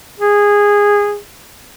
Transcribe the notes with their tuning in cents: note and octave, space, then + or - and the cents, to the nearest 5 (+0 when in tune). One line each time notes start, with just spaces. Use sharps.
G#4 -15